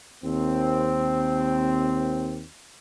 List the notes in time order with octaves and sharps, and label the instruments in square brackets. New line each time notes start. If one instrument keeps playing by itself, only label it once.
[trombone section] D#2 C4